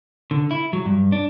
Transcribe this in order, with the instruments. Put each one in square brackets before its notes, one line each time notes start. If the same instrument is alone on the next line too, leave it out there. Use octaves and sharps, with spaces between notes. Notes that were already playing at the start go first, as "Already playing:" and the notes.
[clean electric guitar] D3
E4
F#3
G2
D4